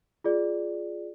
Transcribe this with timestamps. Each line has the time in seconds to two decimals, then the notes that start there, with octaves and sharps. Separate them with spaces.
0.24 F4 G#4 D5